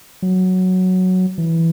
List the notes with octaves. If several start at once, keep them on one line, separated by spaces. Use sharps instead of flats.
F#3
E3